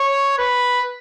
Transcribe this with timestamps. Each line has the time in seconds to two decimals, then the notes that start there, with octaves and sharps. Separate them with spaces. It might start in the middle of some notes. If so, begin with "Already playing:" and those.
Already playing: C#5
0.38 B4